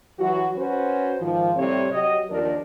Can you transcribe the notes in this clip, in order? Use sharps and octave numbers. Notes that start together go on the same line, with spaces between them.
E3 F#3 F#4
C#4 F#4 B4 C5
G#2 D#3 F3
A2 C3 G3 C4 C#5
F#3 G4 D#5
D#2 F3 D4 A#4